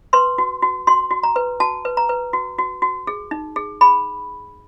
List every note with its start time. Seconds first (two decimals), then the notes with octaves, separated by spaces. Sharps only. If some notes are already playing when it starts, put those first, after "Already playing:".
0.13 B4 C6
0.38 F#4
0.62 F#4
0.87 F#4 C6
1.11 F#4
1.23 A#5
1.36 B4
1.60 F#4 A5
1.85 B4
1.97 A#5
2.09 B4
2.33 F#4
2.59 F#4
2.82 F#4
3.07 G#4
3.31 D#4
3.56 G#4
3.81 G#4 B5